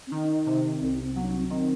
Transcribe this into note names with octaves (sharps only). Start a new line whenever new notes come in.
C4
D#3 D#4
C3
C2 C4
C4
F#3 B3
D#4
C4
D#3 C4